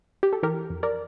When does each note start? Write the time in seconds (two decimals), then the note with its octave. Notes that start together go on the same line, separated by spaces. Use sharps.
0.23 G4
0.33 A4
0.43 E3 G4 A#4
0.70 F2
0.83 A#4 D5